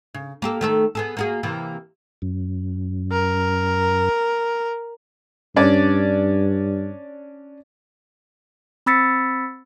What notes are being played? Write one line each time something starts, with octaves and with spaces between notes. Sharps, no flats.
C#3
A#3 G4 A4
D#3 A3 A4
B3 G#4 A4
A#3 F#4 G#4
C3 E3 A#3
F#2
A#4
G2 C#4 D4 D5
C4 B5 E6 A6 B6 C#7